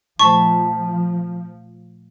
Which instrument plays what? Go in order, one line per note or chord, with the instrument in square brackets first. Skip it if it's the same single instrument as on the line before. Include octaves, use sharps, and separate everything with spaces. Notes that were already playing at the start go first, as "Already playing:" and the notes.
[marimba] A#2 A3 C5 [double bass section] F3 [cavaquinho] A5 B5 [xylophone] C#6